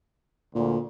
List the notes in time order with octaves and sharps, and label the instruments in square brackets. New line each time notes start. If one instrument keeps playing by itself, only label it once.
[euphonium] D2 [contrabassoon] A#2